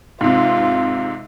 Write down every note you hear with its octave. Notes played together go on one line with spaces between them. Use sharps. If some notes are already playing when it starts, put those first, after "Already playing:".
G#2 C3 F4